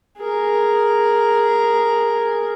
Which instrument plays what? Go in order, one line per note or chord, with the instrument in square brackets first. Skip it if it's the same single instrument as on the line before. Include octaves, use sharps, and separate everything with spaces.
[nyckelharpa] G#4 A#4